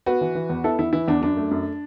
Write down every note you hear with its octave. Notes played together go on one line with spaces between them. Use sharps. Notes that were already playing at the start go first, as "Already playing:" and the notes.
B3 F#4 B4
E3
E3
E2
B3 E4 A4
E2 E4
E3 E4
E2 D4
F#2 D4
A3
F#2